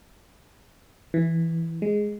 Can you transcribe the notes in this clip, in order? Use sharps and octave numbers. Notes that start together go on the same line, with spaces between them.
E3
G#3